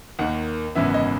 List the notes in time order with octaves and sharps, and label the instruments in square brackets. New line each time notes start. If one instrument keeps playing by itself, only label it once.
[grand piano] D#2 D#3 A#3 F#5
G#1 F#2 C#3 E3 B3 E5
D#5